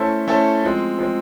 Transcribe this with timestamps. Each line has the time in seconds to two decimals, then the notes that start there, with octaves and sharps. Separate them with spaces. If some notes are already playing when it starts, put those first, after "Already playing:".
Already playing: A3 C#4 E4 A4 C5
0.28 A3 C#4 E4 A4 C5
0.63 F3 G#3 C4
0.99 F3 G#3 C4